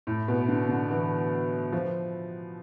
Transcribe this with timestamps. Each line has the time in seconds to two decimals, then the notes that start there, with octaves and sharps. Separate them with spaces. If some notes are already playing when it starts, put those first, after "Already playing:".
0.07 A2
0.28 B2
0.48 D3
0.69 D3
0.90 E3
1.72 F3